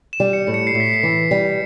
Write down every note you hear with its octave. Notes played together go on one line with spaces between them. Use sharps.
E7
G3
C#7
A2
C#7
C7
A2
B6
C7
E3
G3